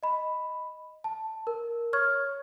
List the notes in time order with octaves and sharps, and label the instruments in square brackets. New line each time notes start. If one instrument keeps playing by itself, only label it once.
[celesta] D#5 B5
A5
A#4
C#5 C#6 F6 G#6